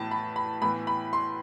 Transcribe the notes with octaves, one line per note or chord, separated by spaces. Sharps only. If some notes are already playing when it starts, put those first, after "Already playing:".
Already playing: A2 E3 B3 A5
B5
B5
A2 E3 B3 B5
B5
C6